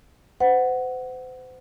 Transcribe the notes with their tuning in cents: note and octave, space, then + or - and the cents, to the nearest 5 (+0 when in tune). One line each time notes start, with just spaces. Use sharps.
C5 -35 F#5 +0